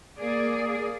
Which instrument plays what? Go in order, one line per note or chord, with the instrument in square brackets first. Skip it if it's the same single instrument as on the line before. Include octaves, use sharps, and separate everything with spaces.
[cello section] A#3 G#4 D5